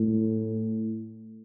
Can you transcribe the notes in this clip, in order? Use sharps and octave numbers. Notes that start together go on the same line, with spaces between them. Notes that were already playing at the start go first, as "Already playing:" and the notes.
Already playing: A2